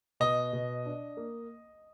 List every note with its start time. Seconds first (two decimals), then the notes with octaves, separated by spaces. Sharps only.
0.20 B2 D#5
0.53 B2
0.85 D4
1.17 A#3